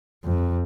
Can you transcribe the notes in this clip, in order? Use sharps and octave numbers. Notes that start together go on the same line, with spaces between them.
F2